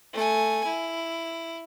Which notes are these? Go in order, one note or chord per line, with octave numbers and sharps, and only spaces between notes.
A3 G#5
E4